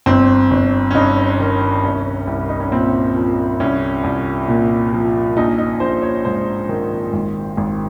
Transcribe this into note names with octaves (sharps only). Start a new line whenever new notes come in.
G1 C4
G1
C#4
G2 D#4
D#3
C2 C#4
C2
D#4
C#4
A#2 C4
F3
C2 C#4
C2
A#2
F3
A#1 D#4
D#4
A#1 C5
C#5
G#2 C5
D#3
G#1
G#1